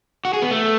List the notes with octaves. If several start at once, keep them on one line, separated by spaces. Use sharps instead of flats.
F#4
G#4
B3
A3